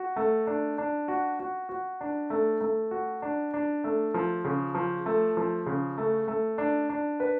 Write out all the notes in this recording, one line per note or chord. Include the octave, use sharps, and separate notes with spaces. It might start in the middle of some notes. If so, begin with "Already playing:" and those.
Already playing: F#4
A3
D4
D4
F#4
F#4
F#4
D4
A3
A3
F#4
D4
D4
A3
F3
C#3
F3
A3
F3
C#3
A3
A3
D4
D4
B4